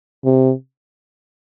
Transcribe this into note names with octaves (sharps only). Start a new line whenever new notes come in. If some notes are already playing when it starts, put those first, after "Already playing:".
C3